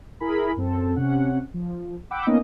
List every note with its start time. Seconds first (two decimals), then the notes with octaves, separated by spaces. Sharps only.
0.20 E4 G#4 A#4 B5
0.57 F#2 C4 A4
0.96 C3 C#4 F#5
1.54 F3
2.11 F#5 G5 B5 D6 E6
2.26 A#3 B3 C#4 D#4 D#5